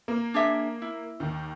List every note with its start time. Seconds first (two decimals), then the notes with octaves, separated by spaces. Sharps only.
0.08 A#3
0.34 D4 G#4 E5
0.82 E4
1.20 D#2 D#3